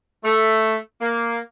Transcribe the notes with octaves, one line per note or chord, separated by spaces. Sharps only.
A3
A#3